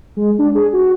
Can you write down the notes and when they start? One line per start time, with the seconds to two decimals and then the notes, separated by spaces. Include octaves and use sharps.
0.17 G#3
0.39 D4
0.55 G#4
0.73 F#4